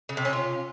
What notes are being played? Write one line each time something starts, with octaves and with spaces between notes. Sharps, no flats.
C#3
C3
C#4
F4